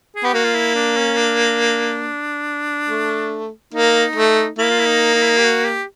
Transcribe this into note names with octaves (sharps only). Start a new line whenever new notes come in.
G#4
B3 G4
A#3 F#4
F4
E4
D4
C#4
D4
A3
A#3 D#4
A3
A#3 E4
F4
E4
D#4
D#4
E4
D#4
G4
F#4
G4